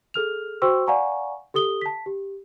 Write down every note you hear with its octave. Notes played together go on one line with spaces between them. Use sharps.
G#4 A4 F6 F7
F#4 C5 G5 C6 C#6 E6
D5 F5 F#5 G#5 A#5 C#6
G4 A4 D#6 G7
A5 B6
G4